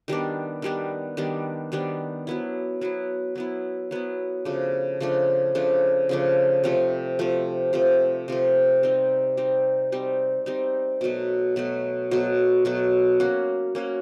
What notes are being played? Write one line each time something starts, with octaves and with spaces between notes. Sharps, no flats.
D#3 G3 B3 D4
D#3 G3 B3 D4
D#3 G3 B3 D4
D#3 G3 B3 D4
F#3 B3 E4
F#3 B3 E4
F#3 B3 E4
F#3 B3 E4
C#3 F3 A3 D4
C#3 F3 A3 D4
C#3 F3 A3 D4
C#3 F3 A3 D4
C3 F3 A3
C3 F3 A3
C3 F3 A3
C3 F3 A3
G3 C4 D#4
G3 C4 D#4
G3 C4 D#4
G3 C4 D#4
B2 F#3 A3
B2 F#3 A3
B2 F#3 A3
B2 F#3 A3
A#3 C#4 F#4
A#3 C#4 F#4